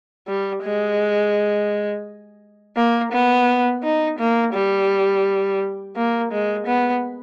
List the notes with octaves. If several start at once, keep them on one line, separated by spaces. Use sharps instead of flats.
G3
G#3
A#3
B3
D#4
A#3
G3
A#3
G#3
B3